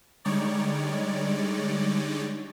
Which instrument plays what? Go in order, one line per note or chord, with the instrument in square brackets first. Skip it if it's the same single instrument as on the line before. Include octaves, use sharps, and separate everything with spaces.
[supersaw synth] D3 G3 G#3 D#4 C#5 D5